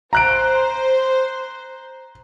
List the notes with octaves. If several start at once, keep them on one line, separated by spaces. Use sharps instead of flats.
C5 A#5 F#6 D7